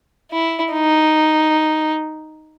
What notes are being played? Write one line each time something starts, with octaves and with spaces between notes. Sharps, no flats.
E4
D#4